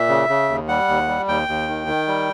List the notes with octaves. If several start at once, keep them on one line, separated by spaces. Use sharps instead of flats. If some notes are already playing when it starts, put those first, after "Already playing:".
Already playing: A#2 E5
C#3
C#3
D#2
G3 F#5
D#2
G3
D#2 G5
D#2
D#3
D#3
G3